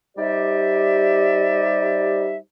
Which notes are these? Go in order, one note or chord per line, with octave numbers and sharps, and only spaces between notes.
G3 D#4 G4 C5 D5 E5